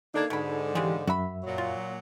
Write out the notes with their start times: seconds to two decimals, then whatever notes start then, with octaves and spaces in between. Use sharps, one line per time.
0.14 A#3 D4 D#4 A4 G#6
0.30 G#2 B2 D3 B5
0.75 C#3 E3 G#3 G4
1.07 F#2 F#4 E5 B5
1.43 A#2 F#3
1.58 F4